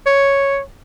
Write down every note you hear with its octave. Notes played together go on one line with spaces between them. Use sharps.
C#5